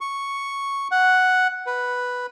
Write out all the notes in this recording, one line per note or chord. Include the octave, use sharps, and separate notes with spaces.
C#6
F#5
B4